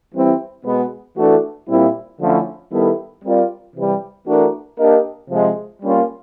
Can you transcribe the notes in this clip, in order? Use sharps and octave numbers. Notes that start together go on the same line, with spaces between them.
E3 G3 C4 E4
B2 G#3 B3
E3 A3 D4 F#4 A4
A#2 G3 C4 E4
D3 F3 A3 C#4 E4
D#3 G3 B3 E4 A4
G3 C4 F4 A#4 D5
C3 E3 G3
E3 A3 D4 F#4 A#4
A#3 D4 G4 A#4 D#5
C3 F3 G#3
G3 A#3 C#4 F4